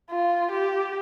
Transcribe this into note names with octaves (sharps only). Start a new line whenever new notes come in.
F4
G4